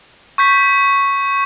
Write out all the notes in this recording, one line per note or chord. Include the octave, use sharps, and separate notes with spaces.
C#6 G6 B6